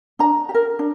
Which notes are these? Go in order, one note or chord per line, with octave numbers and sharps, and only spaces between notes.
D4 A#5
G4
A#4
D4